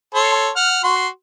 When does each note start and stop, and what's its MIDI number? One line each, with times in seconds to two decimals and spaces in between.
0.15 0.50 69
0.15 0.50 73
0.15 0.50 84
0.56 0.84 78
0.56 0.84 89
0.84 1.08 66
0.84 1.08 84